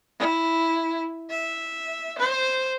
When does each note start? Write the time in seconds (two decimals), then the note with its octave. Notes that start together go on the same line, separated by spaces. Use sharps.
0.19 E4
1.30 E5
2.19 C5